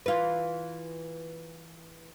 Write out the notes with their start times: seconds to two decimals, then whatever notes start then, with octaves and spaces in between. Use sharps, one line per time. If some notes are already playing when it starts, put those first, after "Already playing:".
0.06 E3 F4 B4